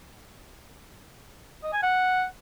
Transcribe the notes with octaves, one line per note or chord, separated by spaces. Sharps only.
D#5
G#5
F#5